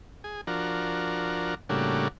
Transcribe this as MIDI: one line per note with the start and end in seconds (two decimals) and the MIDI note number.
0.24 0.41 68
0.47 1.55 53
0.47 1.55 62
0.47 1.55 66
0.47 1.55 70
1.69 2.08 45
1.69 2.08 49
1.69 2.08 55
1.69 2.08 58
1.69 2.08 62
1.69 2.08 66